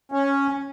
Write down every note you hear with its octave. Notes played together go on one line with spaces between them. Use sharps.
C#4